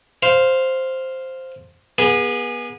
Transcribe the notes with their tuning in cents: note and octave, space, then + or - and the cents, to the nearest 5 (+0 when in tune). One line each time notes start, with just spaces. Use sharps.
C5 +0 F5 +0
B3 -35 G#4 -15